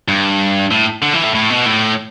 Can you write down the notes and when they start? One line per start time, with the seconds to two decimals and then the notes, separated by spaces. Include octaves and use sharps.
0.08 G2
0.71 A2
1.02 D3
1.13 E3
1.24 A2
1.34 A2
1.50 B2
1.66 A2